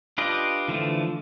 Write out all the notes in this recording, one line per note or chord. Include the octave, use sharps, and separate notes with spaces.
D4 F4 G4 B4 D#5
D3 E3 F3 A3